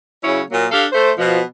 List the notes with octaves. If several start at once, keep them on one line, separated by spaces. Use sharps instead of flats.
C#3 F#3 C#4 E4 C#5
A#2 F#3 A#3
D4 G4 A4 F5
A3 C5
B2 F3